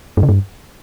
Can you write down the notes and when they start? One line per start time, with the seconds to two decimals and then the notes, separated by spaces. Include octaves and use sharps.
0.17 G2
0.23 C#3
0.29 G2